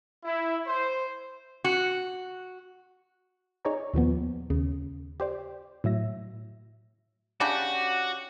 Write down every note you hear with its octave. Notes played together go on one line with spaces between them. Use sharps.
E4
C5
F#4
D#4 G#4 C#5 D5 A#5
D#2 A#2 F3 B3
D#2 C#3
G4 C5 D5
A2 F#3 E5 A#6
C#3 D4 F#4 G4 F#5